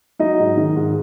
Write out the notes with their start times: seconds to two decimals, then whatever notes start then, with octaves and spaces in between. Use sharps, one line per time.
0.19 F#3 D#4 D#5
0.39 G#2
0.57 D#3
0.76 G#2